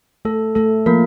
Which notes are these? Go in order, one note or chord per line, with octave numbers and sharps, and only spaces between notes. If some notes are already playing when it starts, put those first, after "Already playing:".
A3 A4
A3 A4
F3 A#3 A#4